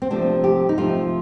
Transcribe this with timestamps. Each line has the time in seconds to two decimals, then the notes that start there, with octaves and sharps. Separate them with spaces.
0.02 C4
0.11 C3 F3 A3 D4
0.44 G4
0.69 D#4
0.78 C3 F3 A3 F4